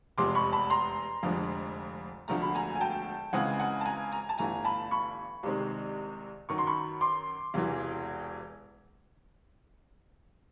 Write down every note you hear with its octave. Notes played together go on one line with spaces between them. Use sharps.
F1 E2 C3 F3 G#3 C6 D6
B5 C#6
A5 B5
A#5 C6
F1 F2 D3 F3 G#3
E1 D2 D3 F3 A3 A#5
B5
G#5 A#5
G#5
G5 A5
C#2 C#3 E3 G#3 C4 F#5 G#5
F#5 G#5
A5
G#5 A#5
G#5 A#5
A5
G1 G2 E3 A3 G#5 A#5
A5 B5
B5 C#6
C2 C3 D#3 G#3 C4
F#2 D#3 F#3 C#6
C6
B5 C#6
C6 D6
E1 E2 C3 E3